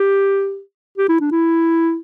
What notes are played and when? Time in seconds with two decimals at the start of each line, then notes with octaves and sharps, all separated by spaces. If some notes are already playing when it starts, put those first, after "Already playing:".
Already playing: G4
0.98 G4
1.09 E4
1.21 D4
1.32 E4